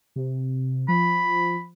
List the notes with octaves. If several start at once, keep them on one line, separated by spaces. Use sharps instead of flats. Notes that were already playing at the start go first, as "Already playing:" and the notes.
C3
F3 B5